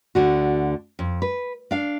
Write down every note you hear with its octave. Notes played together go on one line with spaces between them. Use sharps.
D2 D3 F#4
F2
B4
D4 F5